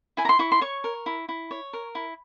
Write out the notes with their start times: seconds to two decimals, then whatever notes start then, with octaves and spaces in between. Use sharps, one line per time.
0.17 E4 G#5
0.25 A#5
0.29 C6
0.39 E4 C#6
0.52 C6
0.61 C#5 C#6
0.84 A#4
1.06 E4
1.29 E4
1.51 C#5
1.73 A#4
1.95 E4